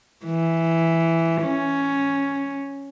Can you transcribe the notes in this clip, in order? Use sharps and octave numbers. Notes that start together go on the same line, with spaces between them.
E3
C#4